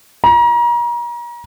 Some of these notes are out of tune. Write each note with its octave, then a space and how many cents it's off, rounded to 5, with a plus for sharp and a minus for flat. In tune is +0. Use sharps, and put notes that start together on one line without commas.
A#5 +35